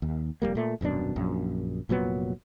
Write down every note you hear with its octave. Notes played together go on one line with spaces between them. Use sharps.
D#2
F1 E2 G3 A#3
A#2 A3
D#1 F#2 B2 D4
A#1 F#2
F1 A#2 F#3 B3